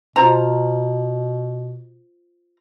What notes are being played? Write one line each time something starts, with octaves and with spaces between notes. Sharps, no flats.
B2 F4 C5 A#5